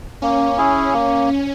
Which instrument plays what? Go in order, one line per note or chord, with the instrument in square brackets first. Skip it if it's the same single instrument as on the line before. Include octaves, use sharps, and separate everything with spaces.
[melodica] A#3 [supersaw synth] C#4
[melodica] C#4 E4 G#4
A#3